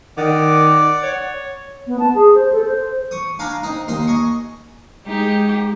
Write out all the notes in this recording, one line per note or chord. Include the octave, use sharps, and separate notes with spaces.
D#3 D5 F#5 D6
C#5
B3
A5
G#4
C5
A4
C5
C#6 D#6
D4 F5 G#5 A#5 B5
C4 D#4
D#2 D#4 C6
D#5 G#5 C#6
G#3 D#4 G4